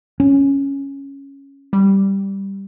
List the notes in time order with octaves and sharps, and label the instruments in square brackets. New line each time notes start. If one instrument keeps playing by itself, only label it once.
[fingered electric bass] C#4
[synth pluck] G3